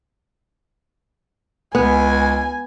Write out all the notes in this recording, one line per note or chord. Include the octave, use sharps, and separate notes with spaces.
C#2 B3 G#5